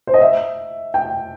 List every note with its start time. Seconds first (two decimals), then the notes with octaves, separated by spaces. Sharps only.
0.07 C5
0.14 D#5
0.21 E5
0.94 G5